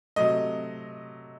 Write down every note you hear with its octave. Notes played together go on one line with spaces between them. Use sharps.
C3 F#3 A3 D#5